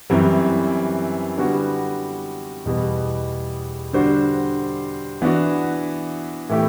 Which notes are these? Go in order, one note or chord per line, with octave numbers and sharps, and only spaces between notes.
F#2 E3 G3 C4
D3 G3 B3 F#4
E2 B2 G3 B3
D3 G3 D4 F#4 C5
E3 B3 D4 F#4
A2 E3 A3 E4 G4